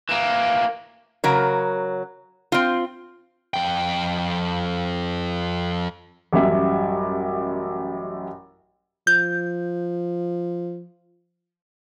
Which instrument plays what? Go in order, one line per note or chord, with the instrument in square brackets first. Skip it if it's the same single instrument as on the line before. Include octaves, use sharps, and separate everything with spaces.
[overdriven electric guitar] E3 A#3
[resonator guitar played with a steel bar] C#3 F#3 A#4
C4 F4
[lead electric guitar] F2 G5
[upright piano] A1 F#2 G3 E5
[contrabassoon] F3 [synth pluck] G6